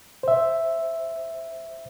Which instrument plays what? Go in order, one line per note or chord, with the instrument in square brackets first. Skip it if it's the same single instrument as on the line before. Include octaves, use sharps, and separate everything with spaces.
[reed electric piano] C5 E5